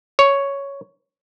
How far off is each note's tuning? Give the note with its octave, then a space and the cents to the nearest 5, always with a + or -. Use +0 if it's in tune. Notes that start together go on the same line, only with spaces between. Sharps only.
C#5 +5